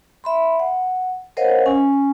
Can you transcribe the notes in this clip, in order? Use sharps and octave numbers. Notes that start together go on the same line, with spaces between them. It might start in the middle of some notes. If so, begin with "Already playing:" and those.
E5 B5 C6
F#5
A#4 C5 C#5 D#5 F5 F#5
C#4 G#5